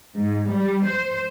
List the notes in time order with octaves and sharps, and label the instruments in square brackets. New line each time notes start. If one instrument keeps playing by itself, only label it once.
[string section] G#2
G3
C5